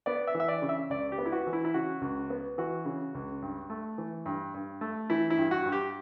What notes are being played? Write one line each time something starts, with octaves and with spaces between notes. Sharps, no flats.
B3 D5
E5
E3
E5
D5
C#3
E5
C#2 D5
G4
B3
E4
F#4
E3
E4
E4
C#3 F#4
C#2
B3
E3 F#4
C#3
C#2
G2
A3
E3
G2
G2
A3
E3 E4
E4
G2
F#4
G2
G4